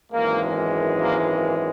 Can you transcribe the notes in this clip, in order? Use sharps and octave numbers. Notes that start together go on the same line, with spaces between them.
G#1 F#2 E3 G#3 A#3
A#3